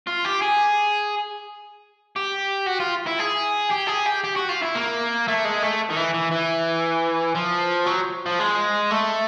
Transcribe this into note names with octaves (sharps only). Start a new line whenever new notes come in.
F4
G4
G#4
G4
F#4
F4
E4
G#4
G4
G#4
G4
G4
F#4
F4
E4
A#3
A3
G#3
A3
D#3
E3
E3
E3
F3
F#3
F3
G#3
A3